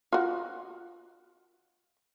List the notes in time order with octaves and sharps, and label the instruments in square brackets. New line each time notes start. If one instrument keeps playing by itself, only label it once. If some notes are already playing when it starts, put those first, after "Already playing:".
[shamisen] F4 F#4